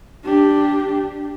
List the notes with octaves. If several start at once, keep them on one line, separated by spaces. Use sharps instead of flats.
D4 G4